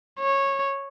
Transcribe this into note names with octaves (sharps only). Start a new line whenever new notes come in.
C#5